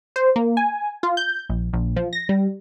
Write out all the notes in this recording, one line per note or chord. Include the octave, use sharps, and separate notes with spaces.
C5
A#3
G#5
F4
G6
A#1
A#1
F3
A#6
G3